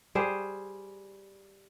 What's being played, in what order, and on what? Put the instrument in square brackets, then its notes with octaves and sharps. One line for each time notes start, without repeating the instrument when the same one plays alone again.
[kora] G3 G#4 C5